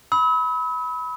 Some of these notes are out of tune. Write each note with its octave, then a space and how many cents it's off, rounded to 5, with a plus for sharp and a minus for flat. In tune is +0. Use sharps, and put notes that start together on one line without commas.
B5 +0 E6 -45